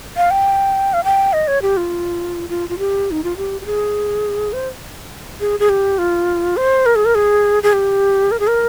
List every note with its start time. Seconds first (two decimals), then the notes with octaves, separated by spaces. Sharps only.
0.17 F5
0.31 G5
0.93 F5
1.04 G5
1.33 D#5
1.48 C#5
1.62 G4
1.77 F4
2.49 F4
2.69 F4
2.79 G4
3.11 D#4
3.24 F4
3.37 G4
3.61 G4
3.66 G#4
4.53 C5
5.40 G#4
5.60 G#4
5.69 G4
5.98 F4
6.57 C5
6.86 A#4
6.96 G#4
7.05 A#4
7.15 G#4
7.63 G#4
7.73 G4
8.31 A#4
8.40 G#4
8.47 A#4